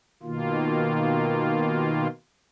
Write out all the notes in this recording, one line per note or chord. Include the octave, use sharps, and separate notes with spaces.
B2 D#3 A#3 F4